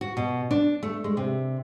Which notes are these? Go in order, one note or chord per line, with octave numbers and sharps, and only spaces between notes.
F#4
B2
D4
A3
G#3
C3